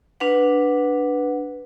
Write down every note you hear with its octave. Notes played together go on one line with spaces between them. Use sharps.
D4 B4 F#5